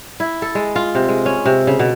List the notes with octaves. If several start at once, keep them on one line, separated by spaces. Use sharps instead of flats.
E4
A4
G#3
F4
C3
G#3
C#4
C3
C#3
B2